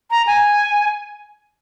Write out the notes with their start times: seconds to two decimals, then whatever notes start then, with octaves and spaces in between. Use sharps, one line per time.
0.11 A#5
0.27 G#5